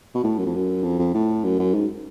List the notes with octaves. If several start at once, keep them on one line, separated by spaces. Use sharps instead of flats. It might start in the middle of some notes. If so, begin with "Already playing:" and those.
B2
A2
F#2
F2
F#2
F2
F2
A2
F#2
F#2
G#2